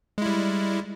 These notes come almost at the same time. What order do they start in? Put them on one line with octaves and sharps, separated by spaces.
G#3 E4 G3